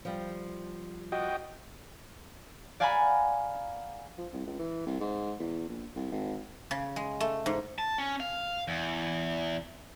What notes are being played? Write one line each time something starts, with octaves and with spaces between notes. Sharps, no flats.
F3 G3
F#4 D#5 G5
D5 F5 F#5 G#5 A#5 B5
F3
C2
C#2
E3
C2
G#2
E2
A#1
C2
G#1
C#3
G#3
A3
G#2
A5
C#4
F5
E2